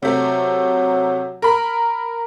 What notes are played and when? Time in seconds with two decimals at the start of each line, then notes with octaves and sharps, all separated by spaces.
0.03 C3 F#3 A3
1.42 A#4 B5